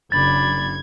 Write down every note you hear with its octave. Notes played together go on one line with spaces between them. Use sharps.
F#1 D4 B5 G#6 A6